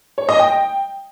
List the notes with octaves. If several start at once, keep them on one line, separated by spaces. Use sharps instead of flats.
C#5
D#5
G5